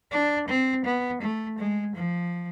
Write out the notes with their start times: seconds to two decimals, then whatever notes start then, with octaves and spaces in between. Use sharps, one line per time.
0.11 D4
0.48 C4
0.84 B3
1.21 A3
1.58 G#3
1.95 F3